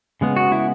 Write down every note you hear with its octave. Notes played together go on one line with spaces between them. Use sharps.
C#3 G#3 B3
F#4
E4